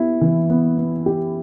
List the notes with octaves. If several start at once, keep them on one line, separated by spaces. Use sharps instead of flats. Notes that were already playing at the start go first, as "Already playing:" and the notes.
Already playing: B3 E4 G4
E3
B3
B3
G4